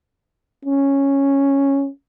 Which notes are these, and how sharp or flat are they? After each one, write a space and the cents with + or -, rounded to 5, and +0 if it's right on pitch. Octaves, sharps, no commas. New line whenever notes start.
C#4 -5